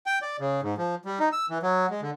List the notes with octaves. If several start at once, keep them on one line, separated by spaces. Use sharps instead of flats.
G5
D5
C#3
G#2
F3
G3
D#4
E6
E3
F#3
G#3
D3